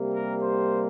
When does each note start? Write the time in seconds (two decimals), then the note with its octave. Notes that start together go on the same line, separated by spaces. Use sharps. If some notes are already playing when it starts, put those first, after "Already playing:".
Already playing: C3 G3 A#3
0.14 A#4
0.42 C5